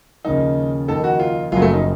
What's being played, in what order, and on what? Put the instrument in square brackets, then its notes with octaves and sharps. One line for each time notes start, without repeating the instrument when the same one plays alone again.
[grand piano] D#2 C#3 F3 A#3 [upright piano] D#4
[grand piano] F2 D#3 A#3 D#4 [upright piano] A4
[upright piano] F#4
F4
[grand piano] F#1 F#2 C#3 F3 [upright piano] F#3 F4
[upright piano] A3
D#4